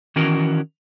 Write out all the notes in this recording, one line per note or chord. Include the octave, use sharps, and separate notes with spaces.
D#3 E3 C#4 F#4 A#4